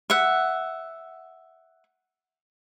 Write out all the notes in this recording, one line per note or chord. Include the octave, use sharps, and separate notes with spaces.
E5 F#5